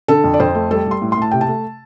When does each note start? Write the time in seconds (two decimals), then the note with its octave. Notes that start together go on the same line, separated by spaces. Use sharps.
0.08 D3 A4
0.24 F2
0.34 D5
0.40 F2 C5
0.55 A3
0.71 G3 A4
0.86 G3 C6
1.02 A2
1.12 C6
1.18 A2 A5
1.31 C3 G5
1.41 A5
1.48 A3